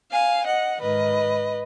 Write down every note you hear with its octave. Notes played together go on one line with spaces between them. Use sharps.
F5 G#5
D#5 F#5
G#2 D#3 B4 D#5